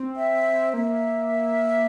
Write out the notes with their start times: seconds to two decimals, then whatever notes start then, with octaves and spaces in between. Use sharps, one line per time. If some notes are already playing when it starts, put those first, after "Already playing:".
Already playing: C4
0.17 E5
0.74 A#3 E5